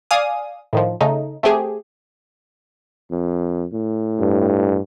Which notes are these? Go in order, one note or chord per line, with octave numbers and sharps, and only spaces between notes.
D5 F5 G#5 D#6
A2 D#3 F3
C#3 A3 D#4
A3 C4 G4 G#4
F2
A2
G2